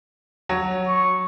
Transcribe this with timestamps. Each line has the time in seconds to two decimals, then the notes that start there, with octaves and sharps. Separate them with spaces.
0.49 F#3
0.87 C#6